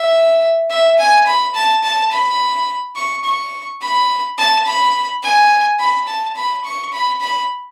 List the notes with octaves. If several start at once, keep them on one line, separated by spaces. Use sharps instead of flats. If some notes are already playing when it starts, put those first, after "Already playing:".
Already playing: E5
E5
G#5
B5
A5
A5
B5
C#6
C#6
B5
A5
B5
G#5
B5
A5
B5
C#6
B5
B5